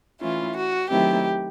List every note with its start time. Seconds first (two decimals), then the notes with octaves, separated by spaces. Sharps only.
0.20 E3 A3 C#4 E4 F4
0.55 F#4
0.90 D#3 F#3 A3 C4 E4 G4